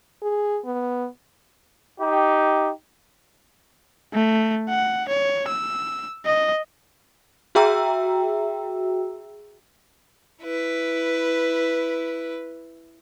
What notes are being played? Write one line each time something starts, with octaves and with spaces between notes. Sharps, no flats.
G#4
B3
D#4 G4
A3
F#5
C#5
E6
D#5
F#4 G#4 E5 G5 A#5 E6
E4 B4